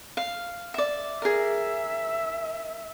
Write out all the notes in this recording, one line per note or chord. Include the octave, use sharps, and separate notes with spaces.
F5
D5 E5
G#4 A#4 E5